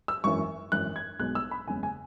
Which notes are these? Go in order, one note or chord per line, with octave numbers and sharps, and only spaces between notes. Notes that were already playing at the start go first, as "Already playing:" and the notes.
E6
G#1 F#2 E3 C#6
G#1 F#2 E3 F#6
G#6
B1 B2 G#3 F#6
E6
B5
F#1 E2 C#3 G#3 G#5
G#5